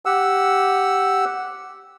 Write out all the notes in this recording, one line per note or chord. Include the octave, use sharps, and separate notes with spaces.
G4 F#5 E6